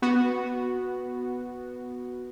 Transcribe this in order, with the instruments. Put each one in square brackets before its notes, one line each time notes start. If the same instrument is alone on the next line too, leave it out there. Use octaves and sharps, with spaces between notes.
[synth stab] B3 F#4